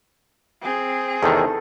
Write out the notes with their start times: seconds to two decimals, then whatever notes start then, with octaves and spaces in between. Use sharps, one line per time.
0.62 C4 G#4
1.23 E2 C3 D#3 A4